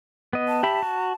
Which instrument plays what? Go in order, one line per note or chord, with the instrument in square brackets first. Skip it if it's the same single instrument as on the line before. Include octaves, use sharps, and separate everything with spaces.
[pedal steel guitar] B3 D#5
[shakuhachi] A5
[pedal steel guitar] G4 E5 B5
F#4